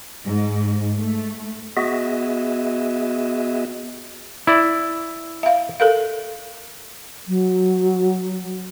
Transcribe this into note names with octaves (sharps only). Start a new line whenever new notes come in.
G#2
A3
B3 F#4 G#4 D#5 E5
E4 D5
E5 F5
A4 A#4 F5
F#3